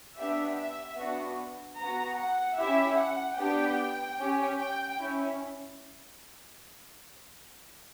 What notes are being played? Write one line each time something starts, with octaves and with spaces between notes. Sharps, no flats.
B3 D4 G4 E5
E5
B3 D4 F#4
B3 F#4 A#5
F#5
C#4 E4 G4 E5
F#5
B3 D4 G4 G5
C#4 G4
G5
C#4 E4